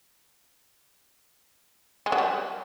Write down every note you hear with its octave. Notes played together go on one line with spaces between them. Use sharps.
G#3
F#3
G3